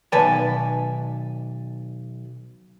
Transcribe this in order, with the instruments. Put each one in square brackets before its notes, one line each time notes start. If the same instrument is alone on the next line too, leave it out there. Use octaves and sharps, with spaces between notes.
[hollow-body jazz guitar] B1 D#3 B4 D5 G#5 A5